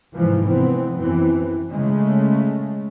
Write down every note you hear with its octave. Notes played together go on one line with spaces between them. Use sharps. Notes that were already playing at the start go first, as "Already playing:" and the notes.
A1 G#2 C3 E3 F3
F1 E3 B3 C4
F#2 E3 C4
C#3 G#3 A3 C#4